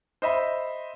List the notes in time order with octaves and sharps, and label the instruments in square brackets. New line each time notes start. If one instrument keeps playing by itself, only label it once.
[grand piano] C5 D#5 E5 B5